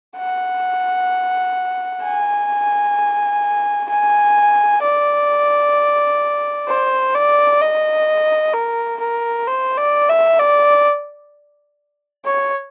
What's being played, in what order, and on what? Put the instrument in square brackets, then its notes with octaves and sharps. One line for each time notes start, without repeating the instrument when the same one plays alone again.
[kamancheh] F#5
G#5
G#5
D5
C5
D5
D#5
A#4
A#4
C5
D5
E5
D5
C#5